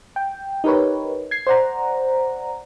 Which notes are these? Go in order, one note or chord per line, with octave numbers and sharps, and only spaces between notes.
G5
D#4 G4 A#4 B4 C#5
G#6 C7
C5 D5 F#5 A#5